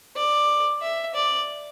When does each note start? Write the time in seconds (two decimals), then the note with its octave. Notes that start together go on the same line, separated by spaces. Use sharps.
0.16 D5
0.81 E5
1.14 D5